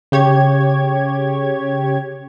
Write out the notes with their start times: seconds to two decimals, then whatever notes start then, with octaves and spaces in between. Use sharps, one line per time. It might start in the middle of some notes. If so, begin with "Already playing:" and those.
0.12 C#3 G4 C#5 G#6